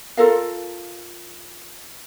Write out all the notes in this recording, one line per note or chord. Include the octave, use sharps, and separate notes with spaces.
F4 A4 A#4 F5